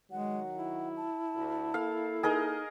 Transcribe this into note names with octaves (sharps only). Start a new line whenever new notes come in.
D#3 F#3 G#3 F#5
E4
A5
D2
A#3 A4 F5
D#4 G#4 A#4 D#5